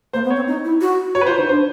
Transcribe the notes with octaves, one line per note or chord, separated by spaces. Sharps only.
A#3 C5
B3
C#5
C4
D#4
E4
F#4
F#4 C#5
B4
F4 C5
D#4 C5
D4 C5